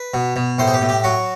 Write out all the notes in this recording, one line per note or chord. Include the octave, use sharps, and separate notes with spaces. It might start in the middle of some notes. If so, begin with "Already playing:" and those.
Already playing: B4
B2
B2
A2 C5
G#4
G4
A2
G4
F#3 F#4